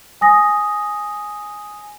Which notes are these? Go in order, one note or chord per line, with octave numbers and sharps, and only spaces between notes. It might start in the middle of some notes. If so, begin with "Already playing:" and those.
G#5 D#6 A#6